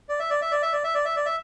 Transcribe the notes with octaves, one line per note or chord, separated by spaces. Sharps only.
D5
E5
D5
E5
D5
E5
D5
E5
D5
E5
D5
E5